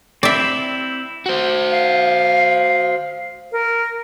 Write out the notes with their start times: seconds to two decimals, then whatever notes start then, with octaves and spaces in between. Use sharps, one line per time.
0.23 C4 E4 D5 E5
1.26 F#4 C5
1.71 F5
3.52 A#4